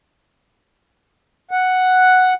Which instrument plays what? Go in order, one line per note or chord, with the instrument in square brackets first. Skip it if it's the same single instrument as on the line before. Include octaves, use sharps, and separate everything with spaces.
[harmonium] F#5